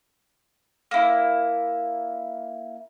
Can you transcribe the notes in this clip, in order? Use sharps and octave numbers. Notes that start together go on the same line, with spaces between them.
A#3 E4